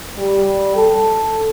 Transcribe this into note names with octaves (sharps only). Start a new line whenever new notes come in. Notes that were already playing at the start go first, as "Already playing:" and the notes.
G3
A4